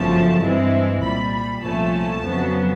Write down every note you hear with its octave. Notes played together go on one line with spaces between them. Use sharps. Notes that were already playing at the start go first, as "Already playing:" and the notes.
Already playing: G1 F#2 C#3 F3 A3 A5
G2 E3 G#3 C4 E4
C2 A#2 G3 B5
B5
C2 A#2 F3 A3 C#4 A5
F2 C#3 F#3 B3